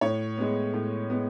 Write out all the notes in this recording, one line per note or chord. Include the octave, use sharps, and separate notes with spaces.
A2 C#5
G#3 B3
A2
G#3 B3